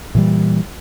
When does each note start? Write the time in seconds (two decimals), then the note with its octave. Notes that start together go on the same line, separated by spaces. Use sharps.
0.15 A#2 E3 G3